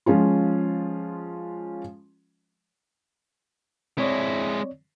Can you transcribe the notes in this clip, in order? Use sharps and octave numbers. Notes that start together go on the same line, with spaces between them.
F3 G#3 C#4 F4
G#3 C4 E4 C#5 D5